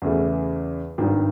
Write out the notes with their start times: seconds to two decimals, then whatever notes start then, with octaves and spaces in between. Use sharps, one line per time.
0.02 E2 C#3 E3 A3
0.98 G#1 G2 D#3